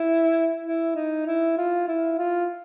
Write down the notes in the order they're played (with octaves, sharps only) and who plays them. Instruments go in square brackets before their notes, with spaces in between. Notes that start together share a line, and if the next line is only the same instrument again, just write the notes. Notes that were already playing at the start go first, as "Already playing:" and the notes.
Already playing: [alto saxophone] E4
E4
D#4
E4
F4
E4
F4